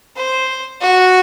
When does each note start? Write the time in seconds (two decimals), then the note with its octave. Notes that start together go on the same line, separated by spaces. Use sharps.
0.16 C5
0.81 F#4